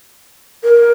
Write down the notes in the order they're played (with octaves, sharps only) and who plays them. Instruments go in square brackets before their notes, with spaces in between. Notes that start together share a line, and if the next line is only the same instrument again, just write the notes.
[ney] A#4